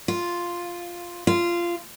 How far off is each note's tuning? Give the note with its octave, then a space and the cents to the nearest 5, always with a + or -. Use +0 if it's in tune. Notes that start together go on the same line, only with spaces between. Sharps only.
F4 +0
F4 -15